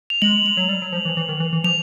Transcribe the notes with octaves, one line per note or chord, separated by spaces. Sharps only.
F7
G#3 F#7
F#7
F#3
G3
F#3
F3
E3
E3
D#3
E3
E3
F3 F7